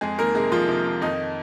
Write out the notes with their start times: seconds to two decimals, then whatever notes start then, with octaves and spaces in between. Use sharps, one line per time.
0.01 F2 G#3 G#4
0.18 D#3 A#3 A#4
0.35 C3 G#3 G#4
0.52 F2 F3 F4
0.68 C3
0.86 C3
1.01 F2 D#3 D#4